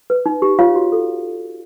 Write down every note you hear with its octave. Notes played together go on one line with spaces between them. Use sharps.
B4
D#4
G4
F4 C#5 F5
F#4
A4